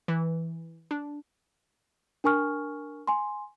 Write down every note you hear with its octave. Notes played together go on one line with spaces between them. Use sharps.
E3
D4
D4 A#4 G#5 C#6 F6
G#5 C6